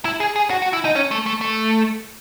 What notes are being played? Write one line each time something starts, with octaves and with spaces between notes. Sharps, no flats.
E4
G#4
G#4
F#4
F#4
E4
D#4
C#4
A3
A3
A3